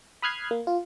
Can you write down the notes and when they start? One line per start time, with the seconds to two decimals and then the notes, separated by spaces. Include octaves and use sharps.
0.22 B5 D#6 F6 F#6 G#6 C7
0.51 A#3
0.67 F4